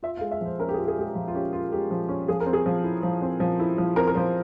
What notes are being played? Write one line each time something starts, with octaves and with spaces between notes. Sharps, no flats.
F4 E5
F5
G#3
E5
F3 C5
C#4 A#4
G4
G#4
F4
G#4
G#3 G4 G#4
F3
F4
C#4 G4
F4
G#3 G4
F3
C#4
F3 G#4
A#4
C4
G#4
F3
E4
F3
C4
F3
E4
F3
C4 A#4
A#4
F3 C5